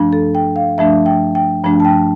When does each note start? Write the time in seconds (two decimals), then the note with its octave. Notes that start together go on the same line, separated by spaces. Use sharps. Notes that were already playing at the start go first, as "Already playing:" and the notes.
Already playing: G2 F3 A3 D4
0.13 A4
0.35 G5
0.56 F5
0.77 G2 F3 A3 D4 E5
1.06 G5
1.35 G5
1.64 G2 F3 A3 D4
1.80 A5
1.85 G5